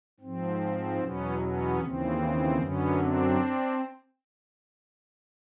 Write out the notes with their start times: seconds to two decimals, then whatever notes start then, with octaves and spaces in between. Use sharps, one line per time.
0.20 G#2 F3 C4
0.99 E2 B2 F#3 B3 C#4
1.38 B3 C#4
1.79 D#2 C#3 E3 C4
2.57 F#2 D3 F#3 B3 C#4
2.97 C4 D4